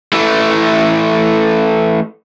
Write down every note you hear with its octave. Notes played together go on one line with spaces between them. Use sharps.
E3 A3